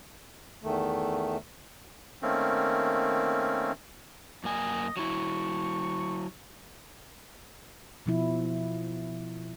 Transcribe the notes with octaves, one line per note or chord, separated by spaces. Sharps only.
E2 D#3 A3
D#3 A3 A#3 C4 C#4
F#2 A#3 D#5 G#5
F#3 E4 C#6
B2 F3 E4